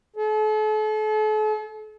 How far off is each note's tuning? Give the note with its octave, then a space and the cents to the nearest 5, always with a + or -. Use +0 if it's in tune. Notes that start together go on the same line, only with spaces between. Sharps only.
A4 -40